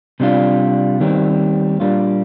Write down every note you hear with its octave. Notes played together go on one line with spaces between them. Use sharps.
C3 G3 D4 F4
D#2 D#3 G3 C4
A#2 G3 A#3 D4 F4